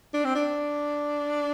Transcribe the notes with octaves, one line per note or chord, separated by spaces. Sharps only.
D4
C4
D4